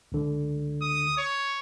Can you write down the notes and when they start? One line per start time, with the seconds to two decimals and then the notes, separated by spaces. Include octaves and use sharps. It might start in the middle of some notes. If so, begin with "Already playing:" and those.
0.12 C#2 D3
0.82 D#6
1.17 C#5